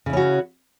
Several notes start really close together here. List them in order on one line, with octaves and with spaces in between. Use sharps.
C#3 E4 C#4 F#4